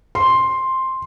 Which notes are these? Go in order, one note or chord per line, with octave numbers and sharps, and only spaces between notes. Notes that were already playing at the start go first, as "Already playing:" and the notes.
C6